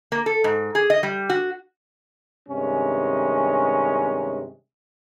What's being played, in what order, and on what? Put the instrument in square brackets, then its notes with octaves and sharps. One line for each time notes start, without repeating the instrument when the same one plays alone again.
[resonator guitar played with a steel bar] A#3
A4
G#2
G#4
D#5
G3
F#4
[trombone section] G2 C3 D#3 G#3 C#4